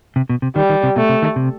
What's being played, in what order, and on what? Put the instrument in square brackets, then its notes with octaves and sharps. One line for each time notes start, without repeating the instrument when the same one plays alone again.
[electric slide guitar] C3
B2
C3
[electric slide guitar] D#3 [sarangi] G3
[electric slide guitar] D#3
C3
[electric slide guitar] B2 [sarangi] A3
[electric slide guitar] C3
D#3
C3